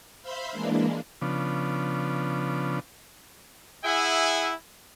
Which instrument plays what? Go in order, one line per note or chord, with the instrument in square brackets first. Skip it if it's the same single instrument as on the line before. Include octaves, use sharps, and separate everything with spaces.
[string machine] C5 E5 F5 B5 C6
E3 G#3 A#3 D4
[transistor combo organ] C#3 F3 B3 D4
[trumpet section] E4 G#4 E5 F#5 G#5